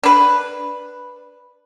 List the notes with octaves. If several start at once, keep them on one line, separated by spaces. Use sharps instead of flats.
D4 B4